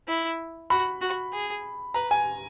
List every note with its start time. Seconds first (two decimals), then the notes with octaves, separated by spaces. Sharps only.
0.08 E4
0.70 F#4 B5
1.01 F#4
1.33 G#4
1.94 B4 A#5
2.11 G#5